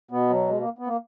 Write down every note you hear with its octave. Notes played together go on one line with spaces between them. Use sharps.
B2 B3
F#3
G#3
A#3
B3
A#3